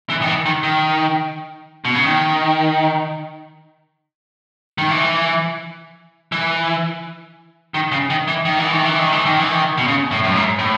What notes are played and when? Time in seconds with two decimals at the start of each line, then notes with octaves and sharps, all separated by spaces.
0.10 E3
0.22 D#3
0.28 E3
0.46 D#3
0.63 D#3
1.85 B2
1.95 C#3
2.06 D#3
4.78 D#3
4.90 E3
6.32 E3
7.74 D#3
7.92 C#3
8.10 D#3
8.28 E3
8.45 D#3
8.59 E3
8.72 D#3
8.85 E3
8.99 D#3
9.12 E3
9.25 D#3
9.39 E3
9.52 D#3
9.77 B2
9.87 C#3
10.11 A2
10.24 F#2
10.36 G#2
10.59 A2